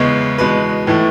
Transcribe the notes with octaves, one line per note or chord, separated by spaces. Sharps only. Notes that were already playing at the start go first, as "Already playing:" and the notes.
Already playing: E2 C#3 E3 G#3
E2 B2 G#3 B4
A2 E3 A3